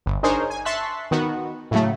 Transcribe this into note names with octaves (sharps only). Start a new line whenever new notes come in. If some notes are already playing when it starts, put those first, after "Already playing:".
G1
D4 D#4 G#4 A#4 C5 C#5
G#5
E5 A5 C6 C#6 F#6 B6
D#3 B3 F#4
A2 C#3 F#3 A3